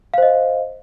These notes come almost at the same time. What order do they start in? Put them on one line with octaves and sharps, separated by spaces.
F5 C5 D#5